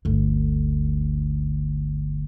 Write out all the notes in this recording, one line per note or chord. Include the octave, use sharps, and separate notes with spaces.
G1 D2